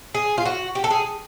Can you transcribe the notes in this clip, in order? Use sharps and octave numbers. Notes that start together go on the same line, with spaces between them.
G#4
F4
F#4
G4
A4
G#4